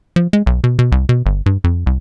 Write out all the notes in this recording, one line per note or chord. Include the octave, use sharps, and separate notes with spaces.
F3
G#3
B1
B2
B2
C2
B2
G1
G2
F2
C2